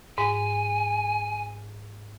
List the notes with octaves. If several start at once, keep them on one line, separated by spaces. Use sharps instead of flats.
G#2 G#5